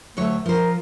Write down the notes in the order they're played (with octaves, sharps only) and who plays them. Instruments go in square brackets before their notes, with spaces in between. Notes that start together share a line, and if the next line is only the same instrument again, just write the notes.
[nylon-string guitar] D2 F#3 C#5 [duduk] A3
[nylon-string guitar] F3 C5 [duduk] A#4